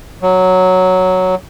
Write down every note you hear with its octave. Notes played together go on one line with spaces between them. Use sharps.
F#3